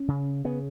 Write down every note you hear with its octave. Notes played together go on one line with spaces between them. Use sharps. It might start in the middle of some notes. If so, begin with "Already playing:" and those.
Already playing: C#4
C#3
C#3 B3